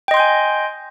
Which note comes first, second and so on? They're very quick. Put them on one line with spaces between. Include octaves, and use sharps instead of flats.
G5 D#5 C6 G6 G#5